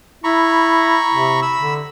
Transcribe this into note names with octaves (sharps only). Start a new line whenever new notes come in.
E4 A#5 B5 C#6
C3
B5 E6
D3